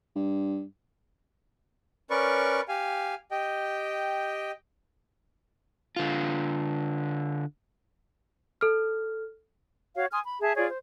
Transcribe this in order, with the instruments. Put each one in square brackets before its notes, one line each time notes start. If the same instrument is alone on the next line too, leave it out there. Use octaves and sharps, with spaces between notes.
[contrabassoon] G2
[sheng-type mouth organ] C#4 A#4 B4 D5 C#6
G4 F5 G#5
G4 D#5 G5
[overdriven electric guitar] D3 F4
[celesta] A4 F6
[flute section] F#4 C#5 F5
G#5 C6 D#6 F6
B5
G#4 E5 A5
F4 G#4 C#5 D5
C5